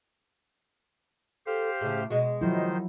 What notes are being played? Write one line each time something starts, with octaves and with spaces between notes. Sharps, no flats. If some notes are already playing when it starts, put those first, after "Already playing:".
G4 A4 C5 F5
A2 C#3 G#4
B2 G#3 F#4 D#5
D#3 F3 F#3 E4 C5